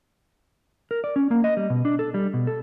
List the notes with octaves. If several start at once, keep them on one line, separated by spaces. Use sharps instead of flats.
A#4
D5
C#4
A#3
D#5
G3
B2
D4
A4
G3
B2
A4